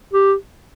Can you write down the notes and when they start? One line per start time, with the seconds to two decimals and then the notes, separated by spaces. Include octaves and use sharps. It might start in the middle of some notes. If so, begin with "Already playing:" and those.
0.14 G4